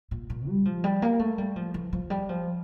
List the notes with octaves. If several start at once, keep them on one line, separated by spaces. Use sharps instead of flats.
A#2
A#2
G3
F3
G3
A#3
A3
G3
F3
E3
F3
G3
F3